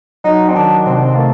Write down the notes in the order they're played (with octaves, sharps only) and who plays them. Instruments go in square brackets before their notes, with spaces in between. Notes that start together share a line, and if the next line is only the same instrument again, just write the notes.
[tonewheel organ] F#3 [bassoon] D#4
[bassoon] C4
[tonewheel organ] D#3 [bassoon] D4
[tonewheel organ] C3 [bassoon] C4
[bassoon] D4
C4
[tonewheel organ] A3 [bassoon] A#3